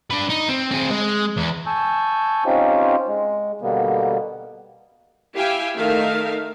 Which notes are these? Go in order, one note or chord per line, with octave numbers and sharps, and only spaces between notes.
D4 B4
D#4
C4
C4 G#4
G#3
E2
G#5 A5 C#6 E6 G6
C4 C#4 D#4 F4 G4 C5
G#3
B2 D3 G3 A#3 B3
E4 G4 E5 F5 G5 G#5
D#3 A3 D#4 A#4 E5 F5